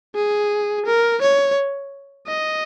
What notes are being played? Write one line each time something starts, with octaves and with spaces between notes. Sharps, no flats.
G#4
A#4
C#5
D#5